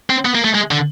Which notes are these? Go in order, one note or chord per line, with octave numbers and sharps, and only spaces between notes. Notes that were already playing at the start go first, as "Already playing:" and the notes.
C4
B3
A#3
A3
G#3
D3